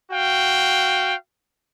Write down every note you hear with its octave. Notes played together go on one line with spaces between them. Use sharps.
F#4 F5 G5